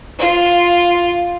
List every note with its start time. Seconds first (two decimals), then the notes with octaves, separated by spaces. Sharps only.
0.19 F4